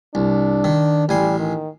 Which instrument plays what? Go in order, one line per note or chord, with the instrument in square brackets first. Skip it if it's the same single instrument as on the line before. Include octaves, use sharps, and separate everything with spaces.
[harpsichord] C2 [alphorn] D4
[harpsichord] D#3
[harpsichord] A1 G#5 C6 [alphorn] G3
[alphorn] D#3